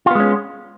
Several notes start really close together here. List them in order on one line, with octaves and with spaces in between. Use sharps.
F4 B3 G#3 C#4